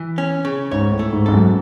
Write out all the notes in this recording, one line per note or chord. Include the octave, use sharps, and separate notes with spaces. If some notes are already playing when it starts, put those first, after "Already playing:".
Already playing: E3
C#4
C#3
G#2 C#5
A2
A3
G#2
G#2 A4
F#2